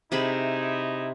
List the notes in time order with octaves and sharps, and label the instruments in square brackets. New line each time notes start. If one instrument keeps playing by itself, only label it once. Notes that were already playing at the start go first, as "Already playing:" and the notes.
[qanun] C3 G#4 B5 [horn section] D#4 E4